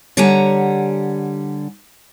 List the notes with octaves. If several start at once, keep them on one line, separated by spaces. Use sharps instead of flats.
D3 G3 C#5 F#5 G#5 A#5